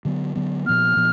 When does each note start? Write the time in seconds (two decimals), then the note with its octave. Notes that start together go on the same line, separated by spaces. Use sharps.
0.05 D3 F#3 B3
0.35 D3 F#3 B3
0.66 A#2 F3 B3 F6
0.97 A#2 F3 B3